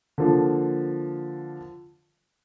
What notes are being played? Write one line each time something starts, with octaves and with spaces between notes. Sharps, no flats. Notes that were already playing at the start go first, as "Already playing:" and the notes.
D3 F3 A#3